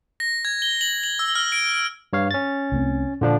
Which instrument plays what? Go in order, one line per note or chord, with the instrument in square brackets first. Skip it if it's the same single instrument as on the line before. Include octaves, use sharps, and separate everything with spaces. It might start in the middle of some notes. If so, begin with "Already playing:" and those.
[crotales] A#6
G#6
G7
F#7
F#7
E6
F6
D7
D7
[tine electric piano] G2 C#5 F5
C#4 A6
[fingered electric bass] C2 A3 C4
[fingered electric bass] A#2 [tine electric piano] D3 F3 D4